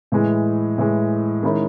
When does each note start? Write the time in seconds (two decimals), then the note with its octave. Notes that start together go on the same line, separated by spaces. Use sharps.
0.12 A2 E3 G#3
0.78 A2 E3 G#3
1.43 D#3 G#3 C#4 E4